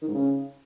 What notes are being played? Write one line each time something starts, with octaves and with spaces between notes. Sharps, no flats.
D#3
G#2
C#3